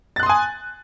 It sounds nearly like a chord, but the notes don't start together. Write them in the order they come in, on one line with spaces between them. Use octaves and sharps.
A6 F#6 C6 D#6 G#5